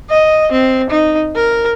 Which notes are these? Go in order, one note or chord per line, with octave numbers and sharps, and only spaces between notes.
D#5
C4
D#4
A#4